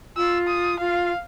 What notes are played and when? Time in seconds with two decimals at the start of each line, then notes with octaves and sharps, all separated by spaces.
0.17 F4 E6
0.47 D#6
0.80 F4 F5